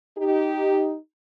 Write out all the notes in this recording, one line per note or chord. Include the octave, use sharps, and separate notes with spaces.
D#4 G4